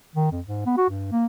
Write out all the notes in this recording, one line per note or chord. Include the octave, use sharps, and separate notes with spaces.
D#3
F2
G#2
B3
F#4
G2
A#3